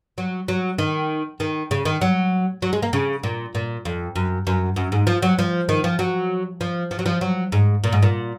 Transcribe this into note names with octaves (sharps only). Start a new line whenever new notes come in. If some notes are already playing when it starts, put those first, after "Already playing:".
F#3
F#3
D#3
D#3
C#3
D#3
F#3
F#3
G#3
A#3
C#3
A#2
A#2
F2
F#2
F#2
F#2
G#2
F3
F#3
F3
D#3
F3
F#3
F3
F3
F#3
F3
F#3
G#2
A#2
G#2
A#2